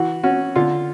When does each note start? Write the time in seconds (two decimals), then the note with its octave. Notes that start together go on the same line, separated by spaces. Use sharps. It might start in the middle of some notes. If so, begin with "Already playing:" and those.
Already playing: E3 F#4
0.23 C#4 F#4
0.56 D3 F4